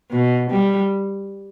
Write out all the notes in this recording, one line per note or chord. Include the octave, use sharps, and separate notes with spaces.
B2
G3